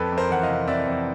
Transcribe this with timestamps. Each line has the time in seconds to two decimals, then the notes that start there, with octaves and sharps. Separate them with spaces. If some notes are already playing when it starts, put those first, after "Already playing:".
Already playing: F2 A4 B4
0.12 F2
0.18 A#4 C5
0.30 E3 F#5
0.43 D#5 F5
0.49 C3
0.67 F2 D5 E5
0.86 F2